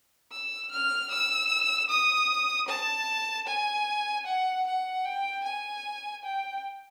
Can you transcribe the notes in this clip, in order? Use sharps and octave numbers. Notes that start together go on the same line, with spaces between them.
E6
F6
E6
D#6
A5
G#5
F#5
F#5
G5
G#5
G5